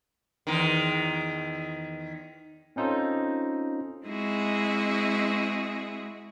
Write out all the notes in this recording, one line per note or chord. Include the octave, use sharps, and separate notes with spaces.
E2 D#3
C4 C#4 D#4 F4 A4 C5
G#3 C4 E4 F#4 G#4